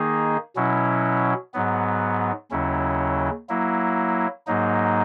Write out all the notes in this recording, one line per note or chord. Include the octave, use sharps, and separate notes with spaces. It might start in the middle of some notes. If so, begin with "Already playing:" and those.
Already playing: D#3 A#3 D#4 G#4
B2 F#3 C#4 E4
G#2 F#3 B3
D#2 C#3 F#3 C#4 E4
F#3 A#3 E4
G#2 F#3 A#3 D#4